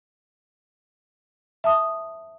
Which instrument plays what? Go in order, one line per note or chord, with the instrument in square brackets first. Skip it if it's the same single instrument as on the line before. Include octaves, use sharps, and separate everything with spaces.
[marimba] E5 A5 D#6